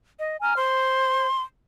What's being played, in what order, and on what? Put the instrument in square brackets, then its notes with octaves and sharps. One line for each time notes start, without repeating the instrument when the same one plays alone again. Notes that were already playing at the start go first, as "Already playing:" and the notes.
[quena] D#5
[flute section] G#5 F6 [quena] A#5
[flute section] C5 [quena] C6